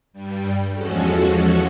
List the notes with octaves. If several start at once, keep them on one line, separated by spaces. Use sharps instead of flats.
G2 G3
E2 F3 G#3 C#4 F#4 A4